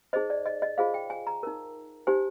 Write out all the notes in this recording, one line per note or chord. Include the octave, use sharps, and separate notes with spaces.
D#4 G#4 C5 D#5
D5
D#5
D#5
F4 G#4 C5 F5
G5
G#5
A#5
D#4 A#4
D#4 G4 C5 G#5